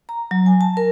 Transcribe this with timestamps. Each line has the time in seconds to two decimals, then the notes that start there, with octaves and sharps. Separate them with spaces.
0.09 A#5
0.31 F#3
0.46 G#5
0.61 A5
0.77 A#4